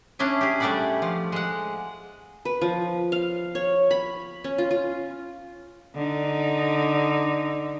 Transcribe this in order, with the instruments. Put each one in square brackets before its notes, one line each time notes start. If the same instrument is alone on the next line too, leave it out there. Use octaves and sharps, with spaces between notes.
[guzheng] C#4 D4 E4 G#4
G4 G#4
G3 A3 G4 D5 F#5 B5
F3
G#3 F#5
[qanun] B4
F3
F5
C#5
B5
C#4
F4
F4
[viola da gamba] D3 D#4